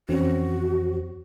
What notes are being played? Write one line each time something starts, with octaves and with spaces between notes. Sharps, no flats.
F2 E3 C4 C#4 F#4